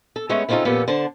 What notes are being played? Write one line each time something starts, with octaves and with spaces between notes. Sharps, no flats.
A4
G#3 A3 B3 C#4 C#5
C#3 C4 C#4 D#4 F4 A4
F2 A#2 B3 C#4 G4 A4
D3 C5 A5